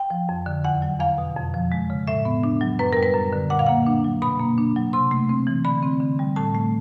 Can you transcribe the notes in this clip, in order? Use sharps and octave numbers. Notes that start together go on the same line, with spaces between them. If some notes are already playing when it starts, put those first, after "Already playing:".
Already playing: G5
F3
F2
D3
E2 F#5
F#3
E2 F5
B2
F2
F3
G#3
C#3
A2 E5
B3
D4
F#3
F#2 B4
G3 A#4
B4
F#2
D3
A#2 F#5
F5
A#3 F#5
D4
F#3
B2 B5
A#3
D4
F#3
C3 C6
A3
C4
E3
D3 B5
C4
D3
G3
A2 A5
A3